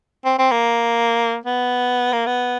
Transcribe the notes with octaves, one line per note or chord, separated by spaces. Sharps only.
C4
C4
A#3
B3
A#3
B3